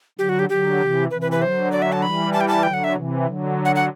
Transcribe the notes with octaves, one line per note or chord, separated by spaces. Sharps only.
D3 F#3 G4
F#4
G4
D3 F#3 G4
C3 E3
C3 E3 B4
B4
B4
D3 F#3 C5
D5
E5
A5
E3 G3 B5
A5
G5
A5
D3 F#3 G5
F#5
E5
C3 E3
D3 F#3
F#5
F#5